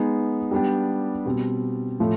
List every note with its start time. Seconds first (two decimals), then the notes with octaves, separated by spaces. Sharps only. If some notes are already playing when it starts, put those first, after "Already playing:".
Already playing: G#3 B3 D#4 G#4
0.51 G3 B3 D4 G4
1.25 B2 G3 C4
2.00 A2 F3 A3